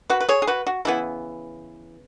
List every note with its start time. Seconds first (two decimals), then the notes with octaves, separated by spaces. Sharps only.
0.10 F#4 B4
0.20 B4
0.29 G#4 C#5
0.42 G#4
0.47 F#4 B4
0.67 F#4
0.85 C#3 E3 B3 E4